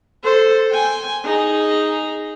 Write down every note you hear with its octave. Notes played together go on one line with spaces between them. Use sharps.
A4 C5
G5 G#5
D#4 G#4